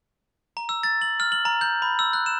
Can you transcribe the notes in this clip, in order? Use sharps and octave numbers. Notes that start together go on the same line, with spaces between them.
A#5
E6
A6
F#7
F6
F#7
A#5
G6
B5
E6
F#6
E7